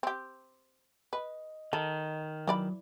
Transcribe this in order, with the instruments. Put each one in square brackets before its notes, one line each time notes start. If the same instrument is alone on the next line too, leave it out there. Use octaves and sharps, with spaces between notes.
[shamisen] C4 G4
[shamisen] B4 [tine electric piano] D#5
[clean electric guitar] D#3 [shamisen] A4
[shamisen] E3 D5 B5 [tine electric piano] F#3